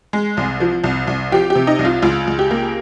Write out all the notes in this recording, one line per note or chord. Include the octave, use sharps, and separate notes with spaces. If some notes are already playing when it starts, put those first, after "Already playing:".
G#3
C2
F3
C2
C2
F3 G4
G4
C3
D#4
C2
F4
C#2 F4
C#2
G4
A#3